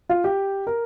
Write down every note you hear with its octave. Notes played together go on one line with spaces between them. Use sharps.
F4
G4
A#4